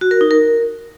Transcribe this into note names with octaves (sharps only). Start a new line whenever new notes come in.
F#4
A#4
D#4
A#4